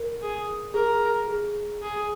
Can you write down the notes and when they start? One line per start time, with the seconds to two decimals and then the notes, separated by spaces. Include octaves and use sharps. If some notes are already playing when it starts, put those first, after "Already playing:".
Already playing: A#4
0.22 G#4
0.74 G#4 A#4
1.28 G#4
1.82 G#4